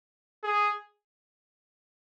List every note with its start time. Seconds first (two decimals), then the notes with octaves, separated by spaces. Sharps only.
0.43 G#4